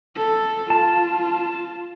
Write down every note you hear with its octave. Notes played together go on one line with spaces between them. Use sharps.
A4
F4 A5